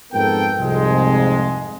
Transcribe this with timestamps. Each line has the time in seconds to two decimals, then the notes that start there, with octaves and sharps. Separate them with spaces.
0.13 F2 G#2 B3 A4 A#4 G5
0.59 C2 F2 G#2 G#3